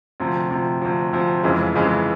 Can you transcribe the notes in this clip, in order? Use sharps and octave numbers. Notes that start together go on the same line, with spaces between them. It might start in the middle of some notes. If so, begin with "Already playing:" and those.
D2 C3 F3
D2 C3 F3
D2 C3 F3
D2 C3 F3
F1 F2 C#3 E3 G#3
F1 F2 C#3 E3 G#3